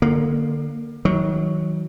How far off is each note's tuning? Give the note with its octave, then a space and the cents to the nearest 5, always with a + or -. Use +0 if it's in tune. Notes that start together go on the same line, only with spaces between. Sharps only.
D3 +25 A#3 +0
D#3 +35 F#3 +0